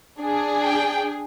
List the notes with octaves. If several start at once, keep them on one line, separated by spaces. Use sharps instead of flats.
D4 G#4
G5